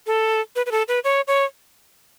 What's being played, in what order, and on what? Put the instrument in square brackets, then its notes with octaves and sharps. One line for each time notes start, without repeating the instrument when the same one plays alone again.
[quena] A4
B4
B4
A4
B4
C#5
C#5